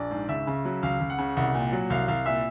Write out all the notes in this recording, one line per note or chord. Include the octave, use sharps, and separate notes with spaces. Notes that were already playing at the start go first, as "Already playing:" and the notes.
Already playing: A#1 D5
G#2
C#2 E5
C#3
F#3
C#2 F5
C#2
F#5
C#3
C2 F#5
A#2
F#3
C2 F5
C2 F5
A#2 E5